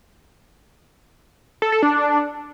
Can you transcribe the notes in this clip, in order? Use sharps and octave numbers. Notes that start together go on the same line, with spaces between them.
A4
A4
D4